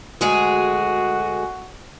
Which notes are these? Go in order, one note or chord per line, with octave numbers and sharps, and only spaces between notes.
D2 G#3 F#4 G#4